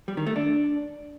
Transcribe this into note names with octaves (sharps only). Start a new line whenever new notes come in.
G3
D#3
A3
D4